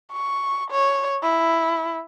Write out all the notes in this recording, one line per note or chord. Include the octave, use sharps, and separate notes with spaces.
C#6
C#5
E4